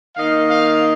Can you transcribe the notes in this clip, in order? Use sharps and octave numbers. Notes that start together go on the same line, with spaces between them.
D#3 A#3 D#4 F5
F5